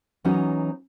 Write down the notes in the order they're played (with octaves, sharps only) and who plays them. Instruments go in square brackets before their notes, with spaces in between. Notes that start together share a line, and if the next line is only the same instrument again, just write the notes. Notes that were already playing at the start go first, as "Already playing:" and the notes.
[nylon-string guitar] E3 F#3 B3 C#4 D#4 F#4